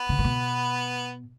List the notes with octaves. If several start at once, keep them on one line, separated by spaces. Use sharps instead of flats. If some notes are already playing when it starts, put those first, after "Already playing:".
Already playing: B3 B4
C#3
A#2
B2